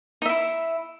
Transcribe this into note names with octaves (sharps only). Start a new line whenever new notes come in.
D#4 E4 E5